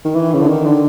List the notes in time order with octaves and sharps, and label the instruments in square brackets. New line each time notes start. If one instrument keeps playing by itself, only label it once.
[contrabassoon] D#3
E3
C#3
D3
D#3
D3